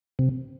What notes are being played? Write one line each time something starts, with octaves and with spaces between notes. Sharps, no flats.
C3